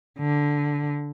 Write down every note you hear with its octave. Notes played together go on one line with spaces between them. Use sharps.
D3